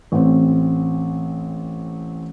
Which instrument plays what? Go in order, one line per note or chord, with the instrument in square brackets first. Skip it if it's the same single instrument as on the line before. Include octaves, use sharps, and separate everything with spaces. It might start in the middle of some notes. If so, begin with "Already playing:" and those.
[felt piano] A1 C4